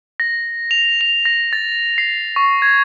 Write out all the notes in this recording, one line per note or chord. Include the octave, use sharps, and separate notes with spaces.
A#6
F7
F7
A#6
A6
C7
C#6
G#6